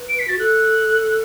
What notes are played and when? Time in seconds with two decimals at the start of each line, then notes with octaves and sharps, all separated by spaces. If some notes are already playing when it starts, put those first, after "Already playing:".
Already playing: B4
0.09 D7
0.19 B6
0.28 F#4 A6
0.38 A4 F#6